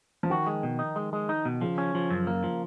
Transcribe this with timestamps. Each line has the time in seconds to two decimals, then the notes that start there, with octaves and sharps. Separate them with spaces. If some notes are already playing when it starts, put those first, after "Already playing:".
0.23 F3
0.30 D#3 F#4
0.47 G#3
0.63 B2
0.79 D#4
0.96 G#3
1.13 G#3
1.29 D#4
1.45 B2
1.61 C#3 F3
1.78 C#4
1.95 F3
2.10 F#2
2.27 A#3
2.44 F3